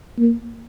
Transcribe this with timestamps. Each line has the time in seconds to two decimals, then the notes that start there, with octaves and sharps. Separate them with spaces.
0.19 A#3